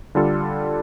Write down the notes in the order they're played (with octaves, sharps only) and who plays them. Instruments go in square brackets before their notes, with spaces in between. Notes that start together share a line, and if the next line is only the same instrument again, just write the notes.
[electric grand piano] D3 G3 D4 F4 A4